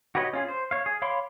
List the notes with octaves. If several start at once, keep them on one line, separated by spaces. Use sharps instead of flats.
F#4 G4 B4 C#5 D#5
C#4 F4 G#4
C5
C#5 F5
G#4
C#5 F5 B5 C6 D6